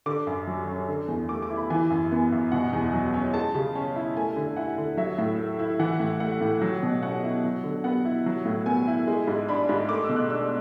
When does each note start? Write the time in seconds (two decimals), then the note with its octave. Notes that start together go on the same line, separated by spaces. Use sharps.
0.06 D3 D6
0.27 F#2
0.47 F#3
0.67 C#4
0.89 D3
1.08 E2
1.29 A3 D6
1.42 D6
1.50 E4
1.56 B5
1.70 E3 G#5
1.90 F#2
2.12 B3
2.32 F#2
2.52 B2 F#5
2.73 E2
2.93 F#3
3.14 C#4
3.34 G#3 A5
3.55 C#3
3.75 C#4
3.96 E4
4.17 A3 G#5
4.36 D3
4.56 E4 F#5
4.78 D3
4.97 F#3 E5
5.18 A2
5.39 A3
5.59 E4
5.79 E3 F#5
6.00 A2
6.20 A3 F#5
6.41 A2
6.61 F#3
6.83 B2
7.02 C#4 F#5
7.24 E4
7.44 F#3
7.64 D3
7.84 B3 F#5
8.05 E4
8.26 F#3
8.45 A2
8.66 B3 G#5
8.87 E4
9.07 G#3
9.27 G#2
9.49 D4 B5
9.69 G#2
9.89 A3 D6
10.04 E6
10.09 B2
10.16 F#6
10.30 D4 E6